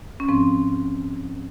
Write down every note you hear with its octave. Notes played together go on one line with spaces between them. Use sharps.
C#4
G#2 F3 C4